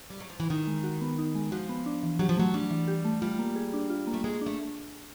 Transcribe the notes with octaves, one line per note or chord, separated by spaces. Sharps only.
G3
F#3
F3
E3
D#3 D#4
G#3
F#4
B3
D#4
G#3
F3 F#4
B3
D4
E3
F#3 G4
F3
F#3 A3
G3 D4
E3
G4
A3
G3 F4
A#3
G#4
D4
F4
A#3
A3
G#3 G#4
D4
A3